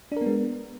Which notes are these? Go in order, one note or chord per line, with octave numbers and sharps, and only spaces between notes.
G#3 B3 D4 A#4